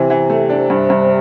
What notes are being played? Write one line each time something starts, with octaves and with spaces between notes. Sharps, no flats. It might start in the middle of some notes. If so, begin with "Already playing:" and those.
Already playing: C3 E3
E3
A3
D4
G2
G2